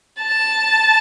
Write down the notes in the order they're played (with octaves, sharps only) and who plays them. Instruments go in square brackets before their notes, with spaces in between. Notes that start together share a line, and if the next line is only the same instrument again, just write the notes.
[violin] A5